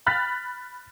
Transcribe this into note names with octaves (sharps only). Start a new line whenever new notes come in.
B5 F6 F#6 A6 B6